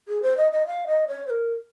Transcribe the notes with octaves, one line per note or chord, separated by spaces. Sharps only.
G#4
C5
D#5
D#5
F5
D#5
C#5
C5
A#4